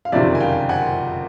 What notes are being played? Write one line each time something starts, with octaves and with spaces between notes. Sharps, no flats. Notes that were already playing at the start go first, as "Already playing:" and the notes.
F5
F#1 F2 C3 D#3 D5 E5
G#5
F5 G5
F#5 G#5